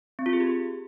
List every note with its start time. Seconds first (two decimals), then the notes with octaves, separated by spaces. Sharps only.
0.19 C4
0.26 F4
0.33 G#4
0.40 G4
0.47 G#4